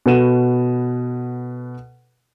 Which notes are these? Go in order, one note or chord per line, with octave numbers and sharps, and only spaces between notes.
B2 A4 B4 F#5 D#7 E7